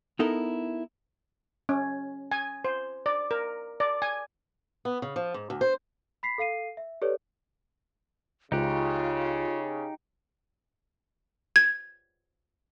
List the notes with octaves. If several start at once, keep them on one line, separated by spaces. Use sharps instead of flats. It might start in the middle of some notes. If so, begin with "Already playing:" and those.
B3 D#4 E4 A4 A#4
C#4
G#5
C5
D5
A#4
D5
G#5
B3
C#3
F3
G#2
D2
C5
B5 B6 C7
A4 F5 C7 D#7
E5
G4 A4 B4 C#5 D5
C#2 C#3 D#4 F4 G4 F#6
G#6